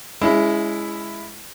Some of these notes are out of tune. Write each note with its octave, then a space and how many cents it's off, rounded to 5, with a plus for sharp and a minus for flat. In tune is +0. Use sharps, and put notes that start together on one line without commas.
G#3 +0 C#4 +35 E4 +10